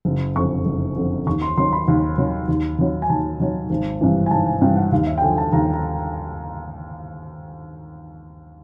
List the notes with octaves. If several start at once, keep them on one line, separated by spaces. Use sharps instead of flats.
F#1
F2 D3 C#6
F#1
F2 D3
D#2 C#6
C6
D#3 F#3 C6
B5
D#2
D#3 F#3
D#2
D#3 F#3
G#5
D#2 A5
D#3 F#3
G#1
G2 E3
G#5
G#1 A5
G#5
G2 E3 G5
F#5
D#2 F5
E5
G5
D3 F3 G#5
A5
D#2 A#5
A#5